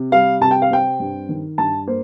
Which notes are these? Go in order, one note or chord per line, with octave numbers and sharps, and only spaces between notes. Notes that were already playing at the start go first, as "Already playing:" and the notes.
Already playing: C3
G3 F5
C3 A5
G5
F5
C4 G5
G2
D#3
G2 A5
A#3 C5